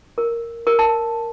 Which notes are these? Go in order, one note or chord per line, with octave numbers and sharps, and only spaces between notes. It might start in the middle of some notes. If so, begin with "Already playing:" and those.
A#4
A#4
A5